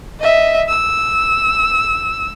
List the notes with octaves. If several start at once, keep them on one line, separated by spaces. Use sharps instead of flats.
D#5 E5
E6